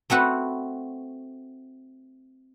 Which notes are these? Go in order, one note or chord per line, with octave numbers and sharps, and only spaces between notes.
A3 C4 F#4 B4